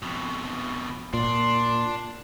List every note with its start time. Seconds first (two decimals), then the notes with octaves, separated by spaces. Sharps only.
0.02 F2 B2
1.14 A#2 D4 C6